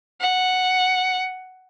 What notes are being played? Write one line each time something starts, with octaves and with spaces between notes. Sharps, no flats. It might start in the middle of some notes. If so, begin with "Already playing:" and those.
F#5